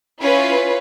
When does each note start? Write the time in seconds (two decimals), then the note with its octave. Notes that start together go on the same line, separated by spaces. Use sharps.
0.21 C#4 E4 F4 B4